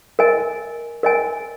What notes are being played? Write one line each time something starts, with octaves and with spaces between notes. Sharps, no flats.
A#4 D#5 G#5
A#4 D#5 G#5